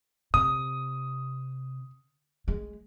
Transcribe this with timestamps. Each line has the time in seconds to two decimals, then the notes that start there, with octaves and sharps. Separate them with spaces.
0.34 C3 D#6
2.48 G#3